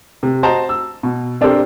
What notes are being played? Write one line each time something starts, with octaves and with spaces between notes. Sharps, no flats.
C3
F#4 C5 D#5 A5 A#5
E6
B2
C4 D4 G4 A4 A#4 C5